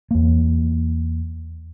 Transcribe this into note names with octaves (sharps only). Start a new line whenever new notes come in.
E2 A#3